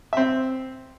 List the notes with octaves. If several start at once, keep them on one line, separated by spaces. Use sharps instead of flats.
C4 E5